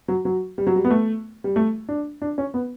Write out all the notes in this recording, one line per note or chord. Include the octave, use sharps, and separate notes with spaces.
F#3
F#3
G3
F#3
G3
B3
A3
G3
A3
D4
D4
C#4
B3